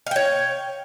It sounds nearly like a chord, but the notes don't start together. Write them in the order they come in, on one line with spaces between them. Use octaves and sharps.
F5 G5 C#5